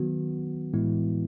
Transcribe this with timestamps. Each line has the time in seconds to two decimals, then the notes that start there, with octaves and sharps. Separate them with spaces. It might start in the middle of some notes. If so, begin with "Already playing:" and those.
Already playing: D#3 F#3 B3 F#4
0.74 A2 E3 G#3 B3 E4